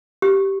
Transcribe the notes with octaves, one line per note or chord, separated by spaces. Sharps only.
G4